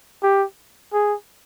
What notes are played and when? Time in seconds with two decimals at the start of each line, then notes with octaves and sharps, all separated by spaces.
0.23 G4
0.93 G#4